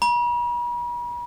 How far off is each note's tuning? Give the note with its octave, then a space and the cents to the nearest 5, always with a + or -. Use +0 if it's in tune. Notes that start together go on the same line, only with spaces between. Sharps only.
B5 -45